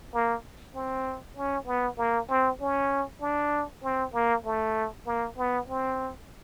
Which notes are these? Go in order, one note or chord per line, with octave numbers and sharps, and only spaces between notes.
A#3
C4
C#4
B3
A#3
C4
C#4
D4
C4
A#3
A3
A#3
B3
C4